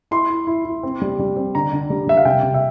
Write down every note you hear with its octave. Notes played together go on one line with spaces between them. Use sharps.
E4 C6
E4
E4
E4
C4
G3
G3
C4
D3 A#5
D3
G3
G3 E5
F5
C3 G5
C3
E5